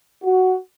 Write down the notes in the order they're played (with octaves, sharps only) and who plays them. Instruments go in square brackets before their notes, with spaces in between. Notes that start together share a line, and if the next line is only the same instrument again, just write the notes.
[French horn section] F#4